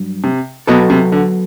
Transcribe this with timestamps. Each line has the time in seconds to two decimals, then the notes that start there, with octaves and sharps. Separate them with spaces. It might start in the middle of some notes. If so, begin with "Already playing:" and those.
Already playing: G2 F#3
0.24 C3
0.67 B2 F#3 B3 F#4 A4
0.90 C3
1.12 D3